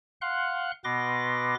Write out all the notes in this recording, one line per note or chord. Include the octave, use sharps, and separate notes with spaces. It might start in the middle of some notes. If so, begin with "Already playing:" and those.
F5 F#5 C6 F#6
B2 B3 B4 C6 D6 A#6